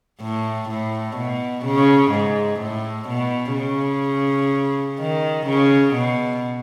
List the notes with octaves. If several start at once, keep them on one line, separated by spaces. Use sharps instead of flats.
A2
A2
B2
C#3
G#2
A2
B2
C#3
D#3
C#3
B2